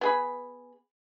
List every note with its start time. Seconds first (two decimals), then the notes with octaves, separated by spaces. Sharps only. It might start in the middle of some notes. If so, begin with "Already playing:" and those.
0.01 B3 G#4 B5